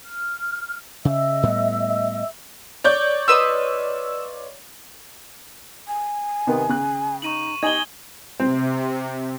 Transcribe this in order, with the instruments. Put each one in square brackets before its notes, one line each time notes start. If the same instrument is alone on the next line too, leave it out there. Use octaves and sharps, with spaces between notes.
[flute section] F6
[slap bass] C#3 [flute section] D#5 E5 E6
[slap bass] A2 G3 B3
[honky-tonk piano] C#5 D5 G6
[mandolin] F4 B4 D#5 [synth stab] E6
[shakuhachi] G#5
[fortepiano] C3 D#3 B3
C#3 F#6
[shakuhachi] D#4 [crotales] C#6 D#7 F#7
[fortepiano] D#4 G#5 [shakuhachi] G4 [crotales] G#6 F#7 G7
[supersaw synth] C3 [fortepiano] C4